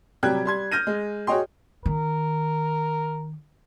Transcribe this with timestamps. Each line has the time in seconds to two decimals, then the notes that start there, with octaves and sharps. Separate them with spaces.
0.23 C3 F#3 G3 G5 F#6 G#6
0.45 G3 C6 G#6
0.72 F6 G6 A#6 D#7
0.87 G#3
1.27 F#4 G#4 C#5 D#5 G5 C6
1.86 D#3 A#4